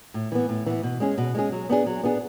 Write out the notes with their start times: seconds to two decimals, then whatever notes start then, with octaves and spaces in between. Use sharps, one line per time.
0.14 A2
0.32 E3 B3
0.49 A2
0.66 E3 B3
0.83 B2
1.00 G#3 C#4 G#4
1.18 B2
1.35 G#3 C#4 G#4
1.52 F#3
1.69 B3 D4 G#4
1.86 F#3
2.03 B3 D4 G#4